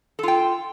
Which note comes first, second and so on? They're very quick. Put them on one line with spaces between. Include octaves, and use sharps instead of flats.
A4 F4 G5